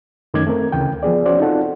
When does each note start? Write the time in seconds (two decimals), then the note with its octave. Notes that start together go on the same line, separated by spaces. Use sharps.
0.34 F#2 D#3 A3 C#4 D6 G#6
0.47 A3 C4 A#4
0.72 D2 C#3 E3 G5
1.03 F3 B3 G#4 D5
1.26 C#4 F#4 C5 D5
1.39 C4 D#4 F4 A4 F#5